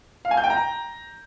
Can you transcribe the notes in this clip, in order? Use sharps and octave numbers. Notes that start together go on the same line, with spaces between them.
F5
G#5
G6
G5
A#5